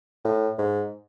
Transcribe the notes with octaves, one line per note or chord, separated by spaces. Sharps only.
A2
G#2